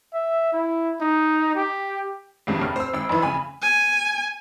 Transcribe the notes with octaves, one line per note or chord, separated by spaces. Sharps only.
E5
E4
D#4
G4
A#1 E2 G2
F1 F6
C5 E6
G#1 E6
F2 E3
C#3 G#5 B5
G#5